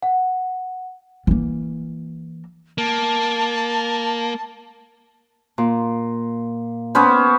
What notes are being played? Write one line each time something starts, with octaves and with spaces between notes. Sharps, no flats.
F#5
E3 A#3
A#3 A5
A#2
B3 C#4 C5 B5